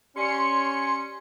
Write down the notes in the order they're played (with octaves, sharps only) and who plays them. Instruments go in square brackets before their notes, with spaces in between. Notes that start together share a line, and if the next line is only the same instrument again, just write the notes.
[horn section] C#4 [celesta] G4 D5 G#5 [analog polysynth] C6 C#7